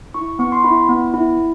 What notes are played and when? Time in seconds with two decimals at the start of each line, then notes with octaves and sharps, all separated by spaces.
0.14 E4 C#6
0.39 B3 C#6
0.52 C6
0.64 E4 B5
0.89 B3
1.14 E4